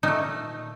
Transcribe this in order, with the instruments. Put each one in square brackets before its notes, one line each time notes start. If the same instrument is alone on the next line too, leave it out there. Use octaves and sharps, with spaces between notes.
[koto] A#2 A3 D#4